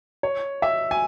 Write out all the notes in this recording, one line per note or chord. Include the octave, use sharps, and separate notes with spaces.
C#5
E5
G#5